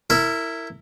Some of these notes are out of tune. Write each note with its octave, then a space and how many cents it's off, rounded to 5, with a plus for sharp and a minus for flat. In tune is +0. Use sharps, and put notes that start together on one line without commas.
E4 +0 A#4 -30